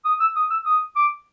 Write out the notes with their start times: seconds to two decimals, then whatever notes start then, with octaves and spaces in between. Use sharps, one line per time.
0.05 D#6
0.20 E6
0.36 D#6
0.50 E6
0.65 D#6
0.96 D6